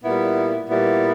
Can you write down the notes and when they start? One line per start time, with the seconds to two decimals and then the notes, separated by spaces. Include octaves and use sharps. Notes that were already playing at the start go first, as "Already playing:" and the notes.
0.04 A#2 G3 B3 E4
0.69 A#2 G3 B3 E4